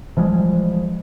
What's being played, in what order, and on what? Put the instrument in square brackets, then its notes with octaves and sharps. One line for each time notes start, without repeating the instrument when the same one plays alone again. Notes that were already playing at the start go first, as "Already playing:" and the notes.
[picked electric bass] E3 F3 G3 G#3